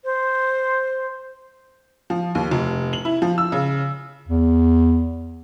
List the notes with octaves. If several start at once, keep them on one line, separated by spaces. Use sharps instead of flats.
C5
F3
D#2
F1
F#7
E4
F3
E6
C#3
E2